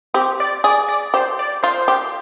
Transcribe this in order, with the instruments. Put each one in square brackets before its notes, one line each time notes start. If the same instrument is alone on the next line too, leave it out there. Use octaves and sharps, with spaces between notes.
[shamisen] C4 [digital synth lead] G4
[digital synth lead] D5
[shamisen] G#4 [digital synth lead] D5
[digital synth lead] D5
[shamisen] G4 [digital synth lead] C5
[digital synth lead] D5
[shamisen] F4 [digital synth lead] C5
[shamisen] G4